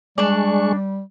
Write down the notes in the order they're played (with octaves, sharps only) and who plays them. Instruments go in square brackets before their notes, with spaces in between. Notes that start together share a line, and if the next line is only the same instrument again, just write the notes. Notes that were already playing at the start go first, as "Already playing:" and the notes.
[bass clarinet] G3 [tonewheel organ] G#3 C#6 [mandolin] D4 D5